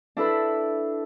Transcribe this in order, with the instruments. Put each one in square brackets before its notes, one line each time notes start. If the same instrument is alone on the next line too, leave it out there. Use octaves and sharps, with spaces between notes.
[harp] D4 E4 A4 B4